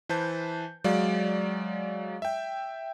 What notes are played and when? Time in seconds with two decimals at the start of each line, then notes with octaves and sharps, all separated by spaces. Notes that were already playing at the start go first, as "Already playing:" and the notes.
0.09 E3 B4 C5 A5 G6
0.84 F#3 G#3 D5 F5
2.22 E5 G5